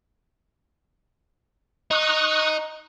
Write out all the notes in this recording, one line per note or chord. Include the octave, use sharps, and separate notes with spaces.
D#4 C#6 D#6 F#6